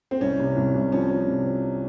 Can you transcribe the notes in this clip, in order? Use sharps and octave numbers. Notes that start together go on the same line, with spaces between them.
C4
C2 C#4
C3
C2
C2
F3 C#4
F3
C3
F3